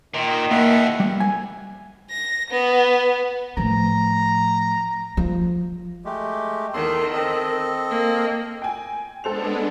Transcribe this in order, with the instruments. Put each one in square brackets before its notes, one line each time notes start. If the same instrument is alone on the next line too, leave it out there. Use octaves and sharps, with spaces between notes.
[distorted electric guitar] A#2 [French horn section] D#3
[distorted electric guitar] E2 B2 [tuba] A#3 [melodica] E5 F#5
[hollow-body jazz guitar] G3
G#5
[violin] A#6
B3
[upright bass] A2 F3 [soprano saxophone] A#5
[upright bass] F3
[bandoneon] G#3 A3 G4
[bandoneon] E2 A4 C6 [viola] D#3
[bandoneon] C4 A4 D#5
[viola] A#3
[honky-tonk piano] G5 G#5
[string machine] G#3 B3 D4 [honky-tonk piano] A4 C5 F7